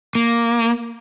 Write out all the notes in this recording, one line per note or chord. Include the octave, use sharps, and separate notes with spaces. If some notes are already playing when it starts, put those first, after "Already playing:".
A#3